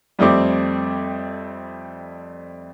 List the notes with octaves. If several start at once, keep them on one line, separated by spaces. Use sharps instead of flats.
F2 G3 A3 C4 D6